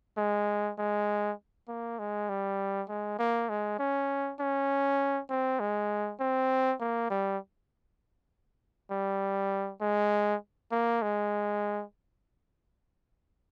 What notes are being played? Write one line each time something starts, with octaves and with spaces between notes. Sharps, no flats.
G#3
G#3
A#3
G#3
G3
G#3
A#3
G#3
C#4
C#4
C4
G#3
C4
A#3
G3
G3
G#3
A#3
G#3